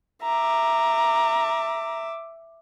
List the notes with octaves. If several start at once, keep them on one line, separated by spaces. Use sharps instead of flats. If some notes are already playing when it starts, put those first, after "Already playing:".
E5 A#5 D6